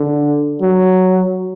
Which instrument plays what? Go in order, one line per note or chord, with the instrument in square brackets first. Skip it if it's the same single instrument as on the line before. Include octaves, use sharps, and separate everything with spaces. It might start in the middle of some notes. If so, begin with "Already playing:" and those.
Already playing: [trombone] D3
F#3